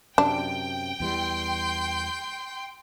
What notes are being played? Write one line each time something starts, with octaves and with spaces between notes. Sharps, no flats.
F#2 C3 D4 G5
E2 E3 G3 C6 G6